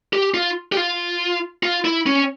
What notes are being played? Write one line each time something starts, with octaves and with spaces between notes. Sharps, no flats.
G4
F4
G4
F4
F4
E4
C#4